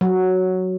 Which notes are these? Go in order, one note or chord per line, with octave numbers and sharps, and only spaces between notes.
F#3